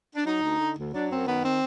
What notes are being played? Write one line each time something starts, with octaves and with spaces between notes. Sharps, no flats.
D4
F#3 D#4
D2
D3
D2
F#3 D4
F#2 C4
D#3 B3
C4